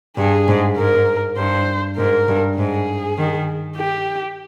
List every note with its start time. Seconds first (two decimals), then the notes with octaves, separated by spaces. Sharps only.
0.17 G2 G#4
0.48 G#2
0.77 G#2 A#4
1.37 G2 C5
1.97 G#2 A#4
2.28 G2
2.58 G#2 G#4
3.18 D#3
3.78 G4